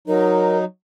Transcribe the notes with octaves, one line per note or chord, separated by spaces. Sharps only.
F#3 D#4 A#4